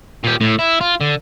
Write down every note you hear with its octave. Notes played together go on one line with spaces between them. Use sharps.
A#2 G4
A2
E4
F4
D3